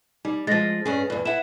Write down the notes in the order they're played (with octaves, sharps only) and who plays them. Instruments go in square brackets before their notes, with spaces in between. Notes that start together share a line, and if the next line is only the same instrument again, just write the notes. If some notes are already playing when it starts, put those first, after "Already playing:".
[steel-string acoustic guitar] G3 [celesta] D#4
[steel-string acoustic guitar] F3 G#3 [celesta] A6 A#6
[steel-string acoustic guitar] G2 C#4 G#4
E2 G2
[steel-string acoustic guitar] E4 F#5 [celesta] E5 E7